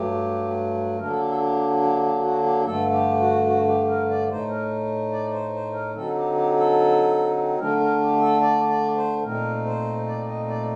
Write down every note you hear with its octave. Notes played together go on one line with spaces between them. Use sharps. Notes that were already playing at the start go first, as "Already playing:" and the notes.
Already playing: G2 F#3 A3 G4
D3 F#3 A#3 D4 A#4
A4
G4
A4
G4
G4
G4
F#4
G4
G2 D3 A3 A4
G4
F#4
F#4
G4
A#4
D5
A2 A3 D#4 C5
A#4
D5
C5
C5
A#4
D3 F#3 C4 D#4 A4
G4
G4
A4
D3 A3 D4 A#4
A#4
G4
A4
D5
D5
C5
A#2 A3 C4 D#4 A#4
C5
D5
D#5
D5